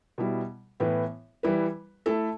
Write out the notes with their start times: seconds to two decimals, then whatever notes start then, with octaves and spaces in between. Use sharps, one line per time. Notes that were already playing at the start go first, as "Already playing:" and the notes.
0.18 B2 G3 E4
0.80 A2 E3 B3
1.43 E3 G3 E4 B4
2.06 A3 E4 A4